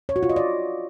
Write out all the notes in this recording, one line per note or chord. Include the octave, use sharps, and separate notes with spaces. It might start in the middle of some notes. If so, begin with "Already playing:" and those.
C#5
F#4
F4
D#5
D5